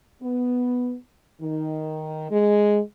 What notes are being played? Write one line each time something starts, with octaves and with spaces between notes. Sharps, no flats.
B3
D#3
G#3